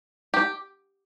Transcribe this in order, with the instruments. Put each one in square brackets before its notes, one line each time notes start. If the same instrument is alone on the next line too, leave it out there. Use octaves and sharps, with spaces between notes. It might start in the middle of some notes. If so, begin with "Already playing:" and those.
[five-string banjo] G4